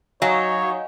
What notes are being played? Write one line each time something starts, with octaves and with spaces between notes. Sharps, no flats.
F#3 D#4 C#5 F5 F#5 G#5